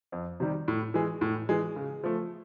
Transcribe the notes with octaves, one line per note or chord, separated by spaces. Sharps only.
F2
C3 D#3 G3
A2
E3 G#3
A2
E3 G#3
C#3
F3 A3